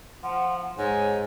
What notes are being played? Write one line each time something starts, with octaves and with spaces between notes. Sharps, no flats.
F3 F#5
G#2 C#5 G#5